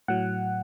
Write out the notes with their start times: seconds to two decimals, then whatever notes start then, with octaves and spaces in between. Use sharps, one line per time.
0.08 A2 F#3 F#5